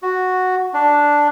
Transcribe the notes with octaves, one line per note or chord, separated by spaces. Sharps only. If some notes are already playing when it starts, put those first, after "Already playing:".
F#4
D4